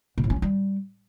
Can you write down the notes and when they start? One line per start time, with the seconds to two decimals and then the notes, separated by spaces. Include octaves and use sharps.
0.18 B2
0.24 A2
0.30 C#4
0.36 F#3
0.42 G3